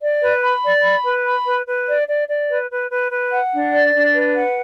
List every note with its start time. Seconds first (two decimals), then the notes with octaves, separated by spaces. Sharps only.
0.01 D5
0.21 B4
0.42 B5
0.63 D5
0.83 B5
1.04 B4
1.24 B5
1.46 B4
1.65 B4
1.87 D5
2.07 D5
2.28 D5
2.49 B4
2.70 B4
2.90 B4
3.10 B4
3.32 F#5
3.51 D4
3.72 D5
3.93 D4
4.13 B4
4.35 F#5